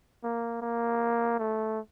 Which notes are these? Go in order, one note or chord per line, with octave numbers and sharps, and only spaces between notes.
A#3
A#3
A3